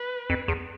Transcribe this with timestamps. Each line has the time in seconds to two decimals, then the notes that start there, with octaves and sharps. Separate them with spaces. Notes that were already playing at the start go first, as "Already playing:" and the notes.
Already playing: B4
0.30 F2
0.48 E2